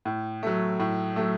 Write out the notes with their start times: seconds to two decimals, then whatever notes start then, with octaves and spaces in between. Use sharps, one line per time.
0.05 A2
0.43 F#3 A3
0.80 A2
1.16 F#3 A3